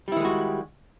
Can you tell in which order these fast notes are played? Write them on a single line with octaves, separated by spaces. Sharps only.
G3 E4 D#3 G#3 F#4